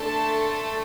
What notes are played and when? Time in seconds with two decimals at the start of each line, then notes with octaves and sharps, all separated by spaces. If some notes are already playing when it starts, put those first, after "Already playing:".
Already playing: A3 D4 A4 A5 C6